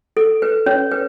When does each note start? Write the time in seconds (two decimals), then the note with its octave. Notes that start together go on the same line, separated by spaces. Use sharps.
0.17 A4
0.42 B4
0.66 C#4 C#5
0.91 B4